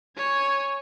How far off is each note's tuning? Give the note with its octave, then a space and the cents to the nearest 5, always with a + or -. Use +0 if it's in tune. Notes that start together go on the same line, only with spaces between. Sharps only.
C#5 +0 G#5 +0